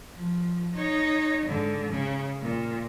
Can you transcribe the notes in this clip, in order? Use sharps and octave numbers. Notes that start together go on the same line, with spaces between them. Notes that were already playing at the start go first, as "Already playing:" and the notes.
F3
D#4 C#5
G#2 D3
C#3
A#2